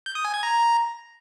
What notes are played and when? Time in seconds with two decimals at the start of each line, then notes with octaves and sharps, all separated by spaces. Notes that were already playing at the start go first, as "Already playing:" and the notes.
0.06 G6
0.15 D#6
0.25 G#5
0.34 G#6
0.43 A#5